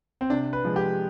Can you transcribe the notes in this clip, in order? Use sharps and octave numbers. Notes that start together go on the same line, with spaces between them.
C4
C3 D4
B4
F3 G#3
G4